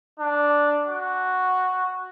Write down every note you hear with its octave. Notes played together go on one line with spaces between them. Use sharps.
D4
F#4